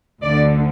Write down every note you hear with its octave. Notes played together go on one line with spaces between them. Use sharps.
D2 D3 D5